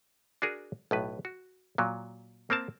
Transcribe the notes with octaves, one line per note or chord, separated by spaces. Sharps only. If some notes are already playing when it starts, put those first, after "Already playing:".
D4 F#4 G#4 A#4
B1 A2 B4
F#4
A#2 F#3
A#3 C4 A#4 A5